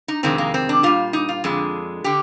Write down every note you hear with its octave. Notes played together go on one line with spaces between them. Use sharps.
D#4
F2 C3 D#3 G#3 C4
A#3
C4
D4
A#2 G3 F4
D#4
F4
F2 D3 G#3
D3 G4